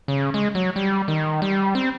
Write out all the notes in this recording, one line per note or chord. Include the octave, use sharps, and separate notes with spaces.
C#3
G#3
F#3
G3
D#3
G3
C4